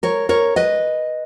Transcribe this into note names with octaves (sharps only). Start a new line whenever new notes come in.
A#4 C#5
A#4 C#5
B4 D#5